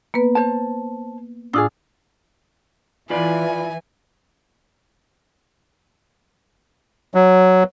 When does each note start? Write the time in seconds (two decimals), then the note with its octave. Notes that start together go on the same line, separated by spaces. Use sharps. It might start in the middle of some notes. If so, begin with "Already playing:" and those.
0.14 A#3 B3 B4
0.35 C5 A5
1.53 A2 D4 F4 G#4 D#6 E6
3.10 E3 F4 B4 D5 G#5
7.14 F#3